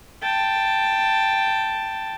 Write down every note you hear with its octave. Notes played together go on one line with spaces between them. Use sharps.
G5 A5